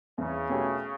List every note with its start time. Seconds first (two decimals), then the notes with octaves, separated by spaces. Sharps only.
0.18 E2 C#3
0.50 B2 A3 C#4 G4